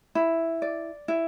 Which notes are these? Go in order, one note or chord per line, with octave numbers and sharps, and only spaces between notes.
E4
D5
E4